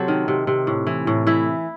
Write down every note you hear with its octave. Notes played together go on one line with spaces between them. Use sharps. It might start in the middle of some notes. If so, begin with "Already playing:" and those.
Already playing: C3 F#3 F#4 A4 C5
D#3
C3
C3
A2
E3
A2
E3 E4